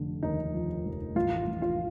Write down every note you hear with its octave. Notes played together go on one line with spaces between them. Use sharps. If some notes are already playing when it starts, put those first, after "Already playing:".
Already playing: F1 D3
D#2 D#4
F3
F1
A1 F4
A1
F4